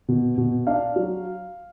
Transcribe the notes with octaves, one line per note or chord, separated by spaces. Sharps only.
B2
B2
D4 F5
F#3